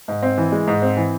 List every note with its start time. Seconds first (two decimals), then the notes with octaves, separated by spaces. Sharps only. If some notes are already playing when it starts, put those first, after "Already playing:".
0.08 G#2
0.22 C4
0.38 E3
0.52 G#3
0.67 G#2
0.82 C4
0.97 E3